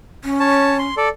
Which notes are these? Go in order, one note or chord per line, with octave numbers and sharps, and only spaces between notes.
C#4
C#5 A5
C6
A4 D5